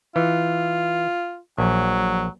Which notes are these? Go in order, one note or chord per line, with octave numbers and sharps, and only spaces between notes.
E3 F4
A#1 F#3